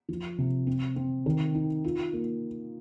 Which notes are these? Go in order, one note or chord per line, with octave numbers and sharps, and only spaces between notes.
F3
C3
C4
C4
D#3
D#4
F4
A#3